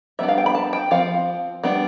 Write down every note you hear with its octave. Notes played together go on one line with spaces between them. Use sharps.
G3 B3 D4 E5
F5
G5
B5
A5
G5
F3 C4 F5
G3 B3 D4